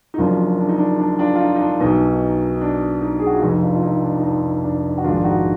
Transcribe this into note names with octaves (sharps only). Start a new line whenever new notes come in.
D#4
F#1 F#2 F3 D4 F4
D4
D#4
D4
D4
D4 F4
F4
D#4
D#4
D4
B1 B2 D#4
D4
D#4
G#4
F#4
F4
F1 F2 F3 D#4
D4 F4
F4
D#4
D4
D#4
D4
D4
F#4
A#1 G#2 D#3 D4 F4
D#4 F#4